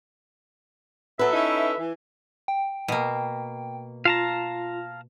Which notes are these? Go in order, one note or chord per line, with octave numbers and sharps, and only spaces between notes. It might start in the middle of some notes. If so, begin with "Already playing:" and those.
F#3 B3 A4 B4 E5
C#4 D#4 E4
E3
G5
B2 A#3
F4 F5 A5 A#5